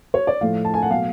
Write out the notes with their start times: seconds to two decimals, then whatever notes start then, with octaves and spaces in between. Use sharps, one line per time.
0.14 C#5
0.27 D5
0.41 A2 F3 A3 F5
0.65 A5
0.74 G#5
0.82 F#5
0.90 B2 F#3 A3 F5